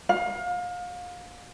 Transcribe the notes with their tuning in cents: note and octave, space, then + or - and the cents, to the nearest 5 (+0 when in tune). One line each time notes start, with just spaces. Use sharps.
F5 +30